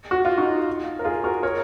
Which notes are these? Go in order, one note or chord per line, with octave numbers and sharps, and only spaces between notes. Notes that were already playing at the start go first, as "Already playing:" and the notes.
F#4
F4
D#4 F#4
A#4
F4 G#4
F#4 A#4
A#4 C#5